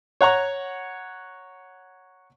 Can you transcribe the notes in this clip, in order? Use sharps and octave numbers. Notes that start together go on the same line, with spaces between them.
C#5 F#5 A#5 C#6